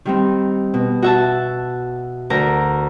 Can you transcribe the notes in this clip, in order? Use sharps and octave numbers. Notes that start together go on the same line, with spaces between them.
D#3 G3 C4
B2
F#4 E5 A5
D2 A#4 A#5